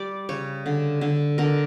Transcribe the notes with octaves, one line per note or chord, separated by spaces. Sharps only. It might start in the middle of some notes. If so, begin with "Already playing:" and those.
Already playing: G3 D5
C#3 C#5
D3
D3
D3 A#4